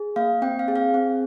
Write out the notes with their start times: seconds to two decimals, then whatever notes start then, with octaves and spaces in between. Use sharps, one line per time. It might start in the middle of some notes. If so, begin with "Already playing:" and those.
Already playing: G#4
0.16 A#3 F5
0.42 C4 G5
0.59 F5
0.68 G#4
0.76 F5
0.94 C4